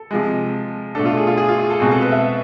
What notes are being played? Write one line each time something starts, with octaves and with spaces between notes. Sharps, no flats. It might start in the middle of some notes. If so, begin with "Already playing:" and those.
Already playing: A4
C3 F3 G#3
B2 A3 D4 A4
F4
G#4
F4
G#4
F4
G#4
A4
B2 G#3 C4 G#4
A4
B4
E5